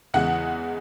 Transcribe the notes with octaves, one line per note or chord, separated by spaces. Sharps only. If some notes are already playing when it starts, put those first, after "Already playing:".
E2 C#3 E3 G#3 F#5